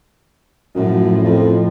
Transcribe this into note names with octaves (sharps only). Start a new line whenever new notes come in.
F#2 A2 F3
F2